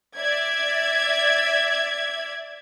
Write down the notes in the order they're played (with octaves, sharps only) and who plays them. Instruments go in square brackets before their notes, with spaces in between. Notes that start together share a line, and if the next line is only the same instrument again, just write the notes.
[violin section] D5 E5 G#6